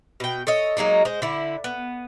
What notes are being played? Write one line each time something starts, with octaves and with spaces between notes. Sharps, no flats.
B2 G5
A4 C#5 D#5
F#3 G#3 A#3 D#4
G#3 C5
D3 E4
B3